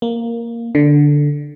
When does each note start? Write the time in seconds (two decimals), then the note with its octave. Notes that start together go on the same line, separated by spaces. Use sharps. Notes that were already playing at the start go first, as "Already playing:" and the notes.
0.02 A#3
0.75 D3